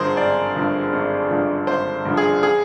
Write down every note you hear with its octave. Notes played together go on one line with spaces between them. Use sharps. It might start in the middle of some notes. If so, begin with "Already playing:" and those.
Already playing: G#1 G2 D3 F3 G#4 A#4 C5
G#1 D5
G2 D3 F3
G#1
G2 D3 F3
G#1 C5
G2 D3 F3
G#4
G#4